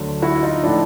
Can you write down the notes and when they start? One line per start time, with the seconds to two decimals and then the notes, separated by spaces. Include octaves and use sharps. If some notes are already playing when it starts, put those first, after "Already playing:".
Already playing: D2 D3 F#3
0.22 E4 F#4
0.43 D#4 F4
0.63 A2 F3 D4 E4